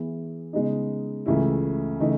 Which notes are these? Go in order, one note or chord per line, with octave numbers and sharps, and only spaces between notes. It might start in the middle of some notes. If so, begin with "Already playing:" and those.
Already playing: E3 B3 E4 G#4
C#3 G#3 B3 D#4
C#2 C#3 E3 A3 E4
C#3 E3 A3 D#4